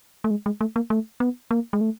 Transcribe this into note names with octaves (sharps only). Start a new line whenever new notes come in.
A3
G#3
G#3
A3
A#3
A3
B3
A#3
G#3
A3